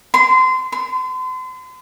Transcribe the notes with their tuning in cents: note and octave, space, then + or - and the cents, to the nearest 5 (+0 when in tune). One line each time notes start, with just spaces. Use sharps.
C6 -25
C6 -40